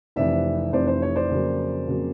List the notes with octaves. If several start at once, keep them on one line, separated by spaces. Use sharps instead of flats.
F1 F2 C3 E3 D5 E5
F1 F2 C3 E3 C5 D5
C5
C#5
C5 D5
F2 C#3 F#3 A#3
F2 C#3 F#3 A#3